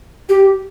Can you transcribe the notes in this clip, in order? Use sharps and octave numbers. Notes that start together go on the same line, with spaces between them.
G4